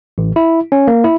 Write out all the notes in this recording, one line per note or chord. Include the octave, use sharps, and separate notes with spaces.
A1
E4
C#4
A#3
E4